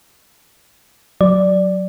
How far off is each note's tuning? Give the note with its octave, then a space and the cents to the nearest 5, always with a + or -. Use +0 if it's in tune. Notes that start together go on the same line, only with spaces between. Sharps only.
F#3 +0 D5 +0